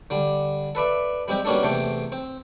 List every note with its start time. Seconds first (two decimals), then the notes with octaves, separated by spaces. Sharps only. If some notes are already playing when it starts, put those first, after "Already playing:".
0.10 D3 G3
0.75 A4 B4 D5 E5
1.28 G3 G#3 C4 G4
1.45 B2 G3 A#3 C#4 D4 A4
1.63 E2 C3 A3 A4 G5
2.12 C4